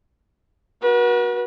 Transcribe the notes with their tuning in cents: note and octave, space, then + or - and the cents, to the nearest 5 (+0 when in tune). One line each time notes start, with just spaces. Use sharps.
F#4 -5 B4 -45